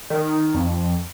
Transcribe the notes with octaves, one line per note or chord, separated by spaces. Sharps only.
D#3
F2